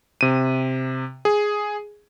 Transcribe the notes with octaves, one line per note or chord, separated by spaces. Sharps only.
C3 D#7
G#4